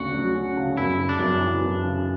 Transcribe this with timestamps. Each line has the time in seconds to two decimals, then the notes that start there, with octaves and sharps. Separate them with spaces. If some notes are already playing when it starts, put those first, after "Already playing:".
Already playing: D2 C#3 C#4 F#4
0.14 F#3
0.35 C#4
0.57 C#3
0.77 F#2 E4
0.99 C#3
1.09 D4
1.19 F#2
1.41 E3
1.61 F#2
1.83 C#3